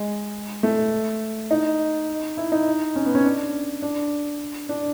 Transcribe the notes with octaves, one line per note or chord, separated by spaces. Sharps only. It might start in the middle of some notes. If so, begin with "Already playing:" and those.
Already playing: G#3
A3
D#4
E4
D#4
C#4
B3
C#4
D4
D4
D4